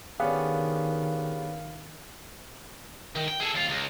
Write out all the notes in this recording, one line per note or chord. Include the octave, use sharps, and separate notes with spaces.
D#3 B3 C#4 D4 G4 G#4 F5 F#5
D#3
G5
G#4 A4
D#2 F4
C#2